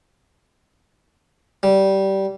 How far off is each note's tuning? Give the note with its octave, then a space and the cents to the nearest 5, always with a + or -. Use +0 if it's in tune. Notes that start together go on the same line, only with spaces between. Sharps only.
G3 -15